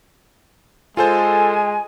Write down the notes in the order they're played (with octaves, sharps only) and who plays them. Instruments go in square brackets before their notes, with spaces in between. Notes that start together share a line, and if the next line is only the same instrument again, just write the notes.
[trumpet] G#3 [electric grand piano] F4 A4 C5 [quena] G#5